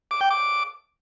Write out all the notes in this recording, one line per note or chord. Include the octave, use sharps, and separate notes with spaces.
D6
G5
D6